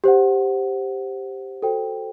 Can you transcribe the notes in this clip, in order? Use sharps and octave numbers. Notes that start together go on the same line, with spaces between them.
G4 C5 F#5
F#4 A4 C5 G5